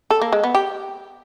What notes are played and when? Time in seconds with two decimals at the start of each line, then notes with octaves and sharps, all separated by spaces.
0.10 A4
0.22 A#3
0.33 G#3
0.44 B3
0.55 G4